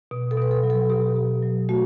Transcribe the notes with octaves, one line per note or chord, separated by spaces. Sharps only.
B2
A4
B2 B4
A4
F#3
A4
B2 G4
B2
F#3
A3 F#4